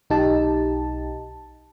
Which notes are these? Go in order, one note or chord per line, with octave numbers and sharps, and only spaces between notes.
B1 D#4 G4 A5